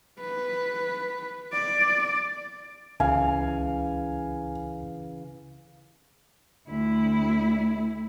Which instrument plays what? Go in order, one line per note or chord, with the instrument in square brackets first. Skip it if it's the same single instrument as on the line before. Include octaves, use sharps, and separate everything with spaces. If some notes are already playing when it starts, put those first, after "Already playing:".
[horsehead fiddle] B4
D5
[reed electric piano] C#2 [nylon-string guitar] C#3 E3 [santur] F5 [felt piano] G#5
[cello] D2 E4